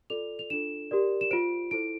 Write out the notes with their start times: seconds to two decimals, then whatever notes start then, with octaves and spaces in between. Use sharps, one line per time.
0.10 F4 A4 D5 F7
0.39 F7
0.50 D4 F4 A4 E7
0.91 G4 A#4 D5
1.21 E7
1.31 F4 C5 D7
1.71 E4 A4 C5 D7